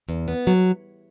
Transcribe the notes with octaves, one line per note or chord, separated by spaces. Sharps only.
E2
B3
F#3